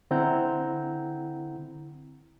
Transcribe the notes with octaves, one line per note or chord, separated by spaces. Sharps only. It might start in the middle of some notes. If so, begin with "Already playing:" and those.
D3 C4 E4 F#5 A#5 G6